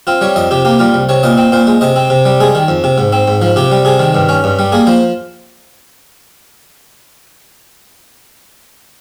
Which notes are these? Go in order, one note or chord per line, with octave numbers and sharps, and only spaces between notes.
C4 F4
G3 C#5
F2 D#5
C3 G4
A#3 G4
G3 F4
C2
C3 C#5
A#2 D#5
C4
A#2 C5
G#3
C3 D#5
C4
C3
G3
G#3 G#4
D#3
F2
C3
G#2
C4
G#2
F3
C3 G4
G3
C3 G#4
D#3
G2
C#4
G2
G3
A#3 G#4
F3 C5